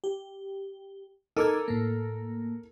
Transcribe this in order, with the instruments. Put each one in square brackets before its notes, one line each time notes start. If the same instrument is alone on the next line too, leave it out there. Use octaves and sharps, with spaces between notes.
[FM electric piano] G4
[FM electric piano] D#4 D6 G#6 [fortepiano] A4 A#4
[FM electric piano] A2 A#3